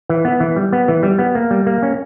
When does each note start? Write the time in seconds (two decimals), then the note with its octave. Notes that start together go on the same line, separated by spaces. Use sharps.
0.09 E3
0.25 B3
0.40 E3
0.56 G3
0.73 B3
0.88 E3
1.03 G3
1.19 B3
1.35 A#3
1.51 G3
1.67 A#3
1.83 C#4